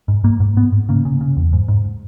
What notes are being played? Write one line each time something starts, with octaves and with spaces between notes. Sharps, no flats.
G#2
G#2 A#3
G#2
G#2 B3
G#2
C#3 A#3
C#3
C#3
E2
G#2
G#2